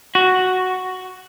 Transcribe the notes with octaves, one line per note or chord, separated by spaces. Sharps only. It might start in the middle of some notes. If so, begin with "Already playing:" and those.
F#4